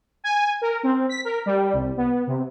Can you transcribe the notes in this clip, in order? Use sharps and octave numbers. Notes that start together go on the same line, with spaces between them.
G#5
A#4
C4
B6
A#4
G3
C2
B3
C3